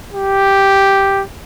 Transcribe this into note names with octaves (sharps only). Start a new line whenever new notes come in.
G4